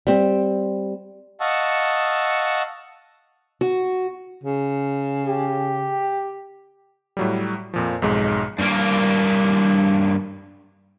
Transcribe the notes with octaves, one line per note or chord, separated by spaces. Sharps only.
G3 C4
D#5 F5 F#5 A5 C#6 E6
F#4
C#3
G4
A2 F#3 G3
F2 A#2 F3
B1 F2 G#2 G#3
G2 A#3